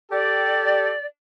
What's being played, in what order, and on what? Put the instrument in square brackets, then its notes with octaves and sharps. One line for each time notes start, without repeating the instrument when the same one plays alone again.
[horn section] G4 A4 [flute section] D5